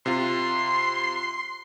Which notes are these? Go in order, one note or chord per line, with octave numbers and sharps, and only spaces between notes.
C3 F4 C6